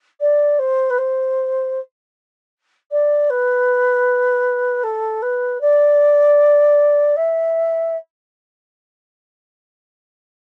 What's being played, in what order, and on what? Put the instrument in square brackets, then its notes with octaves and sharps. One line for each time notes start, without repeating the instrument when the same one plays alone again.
[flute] D5
C5
B4
C5
D5
B4
A4
B4
D5
E5